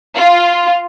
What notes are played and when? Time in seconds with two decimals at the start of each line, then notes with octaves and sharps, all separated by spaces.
0.17 F4